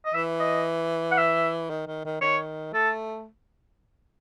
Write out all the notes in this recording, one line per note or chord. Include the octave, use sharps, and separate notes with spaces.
D#5
E3 E5
D#5
F#5
E5
D#3
D#3
D#3
D#3 C#5
A3 A4